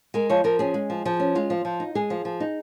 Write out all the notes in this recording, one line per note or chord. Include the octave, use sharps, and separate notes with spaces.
G#3 A#4
F3 C#5
F3 A#4
C#4 G#4
G#3
F3
F3
C#4
G#3 F4
F3
F3
D#4
G#3 G#4
F3
F3
D#4